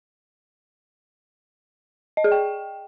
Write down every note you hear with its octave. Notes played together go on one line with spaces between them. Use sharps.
D#5
G#4
G5